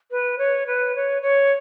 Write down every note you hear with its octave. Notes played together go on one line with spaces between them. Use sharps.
B4
C#5
B4
C#5
C#5